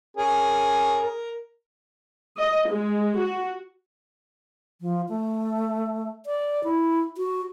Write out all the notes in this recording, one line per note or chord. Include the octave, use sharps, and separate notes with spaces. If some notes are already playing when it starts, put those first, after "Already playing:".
C#4 G#4 A#4
A#4
D#5
G#3
F#4
F3
A3
D5
E4
F#4